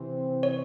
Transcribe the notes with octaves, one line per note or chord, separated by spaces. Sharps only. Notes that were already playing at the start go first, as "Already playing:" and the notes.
Already playing: C3 E3 C4
C#5